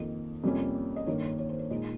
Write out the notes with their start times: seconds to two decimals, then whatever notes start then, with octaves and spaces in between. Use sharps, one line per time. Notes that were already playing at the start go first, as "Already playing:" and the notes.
Already playing: F2 D#3 A#3 D#5
0.43 F2 C3 G3 A#3 C#4
0.96 D#5
1.07 G2 D#3 A#3 C#5
1.22 C#5
1.39 C#5
1.49 C5
1.59 C#5
1.70 A#2 G#3 D#4 D#5